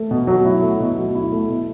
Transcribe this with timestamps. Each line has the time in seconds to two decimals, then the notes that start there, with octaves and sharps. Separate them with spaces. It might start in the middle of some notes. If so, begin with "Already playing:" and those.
Already playing: A3
0.11 B2
0.27 F#3
0.45 E4
0.62 A3
0.80 B2
0.98 F#3
1.15 E4
1.32 A3
1.50 B2